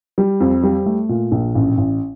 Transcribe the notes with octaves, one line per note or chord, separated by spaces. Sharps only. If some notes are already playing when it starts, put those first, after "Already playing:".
G3
F2
G3
A3
A#2
A#1
A1
A1